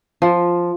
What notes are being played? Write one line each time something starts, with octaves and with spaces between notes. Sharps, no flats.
F3